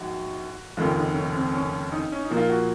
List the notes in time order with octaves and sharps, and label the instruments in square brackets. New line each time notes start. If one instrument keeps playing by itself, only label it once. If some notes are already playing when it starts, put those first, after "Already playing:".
Already playing: [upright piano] A#1 G#2 F#3 [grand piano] F#4
[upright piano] F1 D#2 C#3 [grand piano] F4
[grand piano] D#4
C#4
C4
C#4
D#4
C#4
D#4
[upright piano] A#2 F3 A#3
[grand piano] F4
F#4